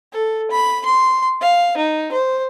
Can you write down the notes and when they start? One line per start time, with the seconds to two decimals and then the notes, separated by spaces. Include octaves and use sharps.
0.13 A4
0.51 B5
0.85 C6
1.41 F5
1.77 D#4
2.12 C5